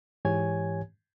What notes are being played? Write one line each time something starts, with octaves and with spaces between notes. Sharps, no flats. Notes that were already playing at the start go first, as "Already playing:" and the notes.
G#2 E3 G4 C#5 G#5 G#6